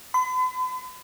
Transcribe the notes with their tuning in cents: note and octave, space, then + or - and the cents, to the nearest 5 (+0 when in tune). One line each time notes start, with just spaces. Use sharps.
B5 +45